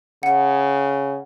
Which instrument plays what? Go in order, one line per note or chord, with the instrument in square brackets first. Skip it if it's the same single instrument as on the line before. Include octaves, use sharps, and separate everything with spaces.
[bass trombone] C#3 [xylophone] F#5